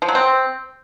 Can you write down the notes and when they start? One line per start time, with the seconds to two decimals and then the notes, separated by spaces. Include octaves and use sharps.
0.02 F3
0.08 F#3
0.15 C4